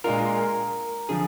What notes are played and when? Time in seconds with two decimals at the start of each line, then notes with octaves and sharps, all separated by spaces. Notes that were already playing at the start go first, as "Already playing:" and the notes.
0.04 A#2 G#3 D4 F4 A#4
1.09 D3 F3 G#4